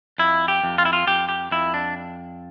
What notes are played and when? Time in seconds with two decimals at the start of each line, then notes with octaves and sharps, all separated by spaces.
0.18 F2 E4
0.48 G4
0.64 F2
0.78 F4
0.85 E4
0.93 F4
1.07 F2 G4
1.29 G4
1.51 F2 E4
1.74 D4